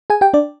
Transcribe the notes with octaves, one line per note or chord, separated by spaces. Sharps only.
G#4 G#5
G4 G5
D4 D5